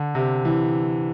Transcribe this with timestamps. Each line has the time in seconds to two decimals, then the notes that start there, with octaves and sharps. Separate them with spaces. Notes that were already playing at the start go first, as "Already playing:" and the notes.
Already playing: D3
0.15 C3
0.45 E3